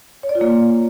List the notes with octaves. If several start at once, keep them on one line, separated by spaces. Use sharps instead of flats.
C#5
D5
F4
A#3